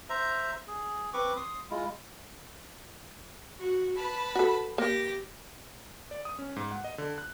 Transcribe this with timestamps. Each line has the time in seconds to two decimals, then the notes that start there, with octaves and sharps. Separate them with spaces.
0.09 C5 E5 A#5
0.68 G#4
1.14 C4 B4 C#6 D6
1.36 C6 D#6
1.71 G#3 E4 F4
3.60 F#4
3.96 B4 A5 B5
4.35 F#4 A4
4.78 A#3 G4 A#6
6.11 D5
6.25 D#6
6.39 C#4
6.56 G#2
6.71 F#5
6.84 D#5
6.98 D3
7.18 F#6